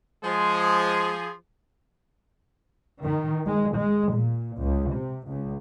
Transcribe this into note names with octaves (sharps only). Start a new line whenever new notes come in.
F3 G#3 G#4
D#3
G#3
G#3
A#2
C#2
C3
C#2